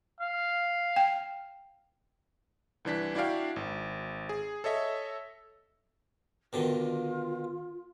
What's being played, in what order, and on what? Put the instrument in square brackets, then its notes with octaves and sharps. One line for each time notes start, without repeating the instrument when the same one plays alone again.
[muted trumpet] F5
[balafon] G5
[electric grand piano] C2 E3 D4 B6
D4 E4 F#4 D5 F5 G5
G#1
G#4
A4 C#5 D#5 E5
[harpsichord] B2 D3 D#3 [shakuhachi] F4